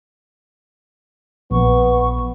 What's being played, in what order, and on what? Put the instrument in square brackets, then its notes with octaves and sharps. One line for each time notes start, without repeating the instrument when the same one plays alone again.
[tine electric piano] A#1 [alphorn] B3 [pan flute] C#6